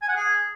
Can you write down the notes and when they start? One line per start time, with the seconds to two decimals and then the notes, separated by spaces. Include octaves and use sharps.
0.02 G#5
0.08 F#5
0.15 G#4